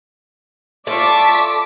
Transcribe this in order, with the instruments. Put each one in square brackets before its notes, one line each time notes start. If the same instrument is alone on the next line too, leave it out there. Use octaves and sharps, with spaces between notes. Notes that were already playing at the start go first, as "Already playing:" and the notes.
[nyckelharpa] F4 C#6 [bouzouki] A4 [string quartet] D5 E5 A5 [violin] D6 B6